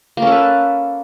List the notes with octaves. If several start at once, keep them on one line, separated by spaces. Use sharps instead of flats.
A#3 C#4 A4 B4